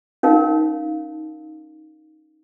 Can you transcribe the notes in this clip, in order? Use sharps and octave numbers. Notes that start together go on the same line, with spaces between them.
C#4 D#4 A#4 F5